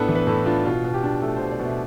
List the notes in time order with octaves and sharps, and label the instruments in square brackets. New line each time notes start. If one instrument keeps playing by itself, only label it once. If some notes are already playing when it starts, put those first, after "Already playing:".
Already playing: [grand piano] A2 B3 D4 A4 B4
E3
B4
A2 A4
D4 F4
B2 F4
B2
G4
D4
A3 A4
B2 C5
D5
B2
E5